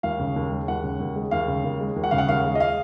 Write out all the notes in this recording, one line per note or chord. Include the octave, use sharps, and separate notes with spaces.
D#2 F5
C#3
D#2
G#3
D#2 F#5
C#3
D#2
G#3
D#2 F5
C#3
D#2
G#3
D#2
F#5
C#3 F5
F#5
D#2 F5
G#3
D#5
F5